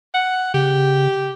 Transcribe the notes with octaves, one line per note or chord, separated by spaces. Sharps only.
F#5
C#3 G4